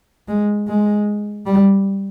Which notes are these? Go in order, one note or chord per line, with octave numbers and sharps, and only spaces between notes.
G#3
G#3
G3